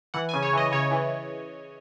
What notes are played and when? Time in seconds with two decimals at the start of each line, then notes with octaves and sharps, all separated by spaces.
0.14 E3 F#5
0.29 G#5
0.34 C#3
0.43 C#5
0.53 E3 D#5
0.72 C#3 C#5
0.91 E3